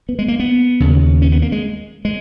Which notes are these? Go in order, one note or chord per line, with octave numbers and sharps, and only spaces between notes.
B3
G#3
A#3
B3
D#2 C#3
C#4
B3
A#3
G#3
G#3